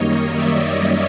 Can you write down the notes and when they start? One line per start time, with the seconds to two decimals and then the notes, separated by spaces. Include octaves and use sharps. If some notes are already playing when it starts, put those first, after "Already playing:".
Already playing: F#2 D#3 G3 A#3 C#5 D#5
0.32 D5 E5
0.73 C#5 D#5